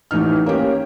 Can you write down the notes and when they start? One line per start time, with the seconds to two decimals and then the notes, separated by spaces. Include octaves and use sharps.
0.11 A1 E3 D#4 F6
0.46 A#3 C#4 G4